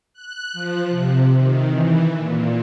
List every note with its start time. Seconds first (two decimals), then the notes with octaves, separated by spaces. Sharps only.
0.14 F#6
0.53 F3
0.89 C3
1.33 D#3
1.68 E3
2.15 A#2